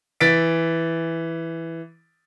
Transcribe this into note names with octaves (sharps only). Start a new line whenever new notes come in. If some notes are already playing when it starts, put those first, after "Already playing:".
E3 A6 B6 D7